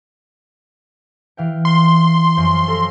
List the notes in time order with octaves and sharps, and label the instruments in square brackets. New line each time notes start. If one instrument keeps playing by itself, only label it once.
[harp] E3 F5 G5
[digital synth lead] C6
[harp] F#2 F3 F5
A4 A#5